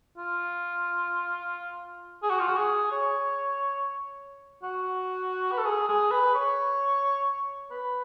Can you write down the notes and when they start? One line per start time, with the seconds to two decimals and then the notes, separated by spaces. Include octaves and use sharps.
0.17 F4
2.23 G#4
2.30 F#4
2.39 F4
2.47 F#4
2.57 G#4
2.92 C#5
4.63 F#4
5.52 B4
5.58 A4
5.65 G#4
5.88 G#4
6.11 B4
6.35 C#5
7.71 B4